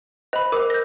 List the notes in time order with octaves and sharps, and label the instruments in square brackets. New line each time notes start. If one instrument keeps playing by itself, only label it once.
[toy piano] C5 [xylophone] D#5 B5
[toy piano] A#4 C5 [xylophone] D6
[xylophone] G6 A#6